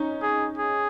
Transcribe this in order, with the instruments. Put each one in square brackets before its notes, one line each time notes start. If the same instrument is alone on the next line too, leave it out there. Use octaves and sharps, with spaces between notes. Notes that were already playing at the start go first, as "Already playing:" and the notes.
Already playing: [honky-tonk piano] C#4 D#4
[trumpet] G#4
G#4